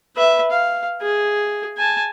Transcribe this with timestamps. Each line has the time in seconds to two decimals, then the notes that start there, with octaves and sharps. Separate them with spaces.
0.16 B4 E5
0.51 F5
1.02 G#4
1.77 G#5 A5